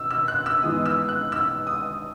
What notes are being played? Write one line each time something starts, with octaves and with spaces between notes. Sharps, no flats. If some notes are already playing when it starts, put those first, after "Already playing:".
Already playing: B2 E6
E6
F#6
E6
G#2 E3 G#3 B3 D#6
E6
F#6
E6
D#6